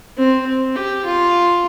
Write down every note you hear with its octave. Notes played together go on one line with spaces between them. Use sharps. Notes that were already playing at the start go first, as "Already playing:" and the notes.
C4
C4
G4
F4